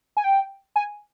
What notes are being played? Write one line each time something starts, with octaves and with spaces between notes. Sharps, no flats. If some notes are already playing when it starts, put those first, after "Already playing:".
G#5
G5
G#5